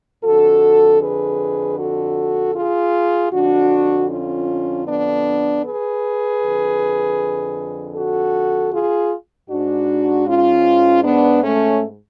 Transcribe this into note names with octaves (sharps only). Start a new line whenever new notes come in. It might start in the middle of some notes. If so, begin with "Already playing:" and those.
F2 D3 F#4 A4
G#4 B4
F#4 A4
F4 G#4
F2 D3 D4 F#4
C#4 F4
B3 D4
G#4 B4
F2 D3
F#4 A4
F4 G#4
G#2 D4 F#4
C#4 F4
B3 D4
A3 C#4